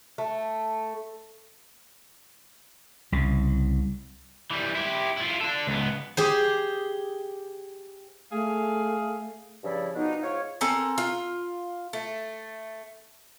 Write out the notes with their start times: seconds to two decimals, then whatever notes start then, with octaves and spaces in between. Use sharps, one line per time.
0.18 A3
3.12 C2 C#3
4.51 E3 G3
4.75 E4 G4
5.17 E4 F4
5.41 D4 A4
5.67 C#2 B3
6.17 G4 G#4 C5
8.32 A3 G#4 F5
9.64 G2 C#3 F3 E4 D5
9.95 B2 F3 B3 D4 D#4
10.22 G#2 F4 C#5
10.61 C4 A4 A#4 G#5
10.98 F4
11.93 A3